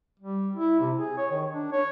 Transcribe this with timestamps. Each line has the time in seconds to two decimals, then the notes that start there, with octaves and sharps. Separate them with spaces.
0.20 G3
0.56 E4
0.80 C3
0.98 G#4
1.17 C#5
1.31 D#3
1.51 D4
1.72 C#5